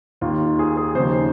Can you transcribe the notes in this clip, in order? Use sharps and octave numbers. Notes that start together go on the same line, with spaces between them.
D#2 D#3 F4
G#4
G#4
D#2 C#3 F3 C5